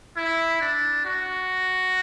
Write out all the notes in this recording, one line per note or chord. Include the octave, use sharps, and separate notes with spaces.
E4
D4
F#4